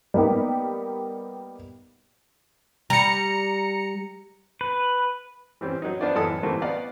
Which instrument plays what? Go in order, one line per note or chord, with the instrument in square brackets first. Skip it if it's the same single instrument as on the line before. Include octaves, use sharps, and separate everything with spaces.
[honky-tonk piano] G3 A#3 B3 D#4 G4
[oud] G3 [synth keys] A#5 C#7
[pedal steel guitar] B4
[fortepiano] E3 G3 C4 C#4
F#3 D#4
B3 D4 F4 C5 D5
F#2 A2 E3 A4 D#5 D#6
D3 E3 G3 A3 A#3 C4
B3 D5 D#5 F5 F#5